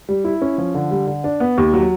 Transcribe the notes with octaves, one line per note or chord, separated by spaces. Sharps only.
G3
E4
C#4
F3
D3
G3
D3
D4
B3
D#2
F#3